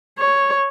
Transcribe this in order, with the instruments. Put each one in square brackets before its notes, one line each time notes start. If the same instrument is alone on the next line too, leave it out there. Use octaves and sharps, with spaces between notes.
[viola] C#5